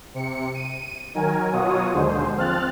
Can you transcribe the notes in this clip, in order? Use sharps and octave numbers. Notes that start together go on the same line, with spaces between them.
C3 C#7
D#7
D#3 F#3 A#4 G#5
B2 F#3 F4 F#4 C#5 D#6
D#2 D3 G#3 C5
F3 C4 F6 F#6 A6